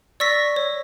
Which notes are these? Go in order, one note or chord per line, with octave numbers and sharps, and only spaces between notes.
D5 C#6 E6 A#6 B6
C#5